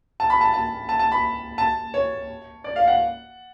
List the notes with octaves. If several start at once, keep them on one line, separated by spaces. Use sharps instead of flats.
A5
B5
A5
A5
A5
A5
B5
A5
C#5
D5
F5
F#5